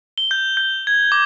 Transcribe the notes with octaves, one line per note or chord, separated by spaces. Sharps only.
G7
G6
G6
G#6
D6